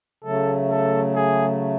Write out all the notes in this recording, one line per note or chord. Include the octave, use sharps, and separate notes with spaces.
C#3 F#3 A3 A4
A4
G#4